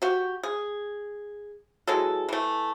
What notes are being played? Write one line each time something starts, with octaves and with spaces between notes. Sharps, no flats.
F#4 G4
G#4
E3 F#3 G#3 A4
E3 A3